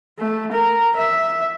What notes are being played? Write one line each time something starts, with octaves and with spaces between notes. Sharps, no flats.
A3
A#4
E5